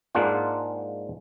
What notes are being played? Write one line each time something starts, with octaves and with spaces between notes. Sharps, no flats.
G#2 G#3 A#3 D4 F4 F#5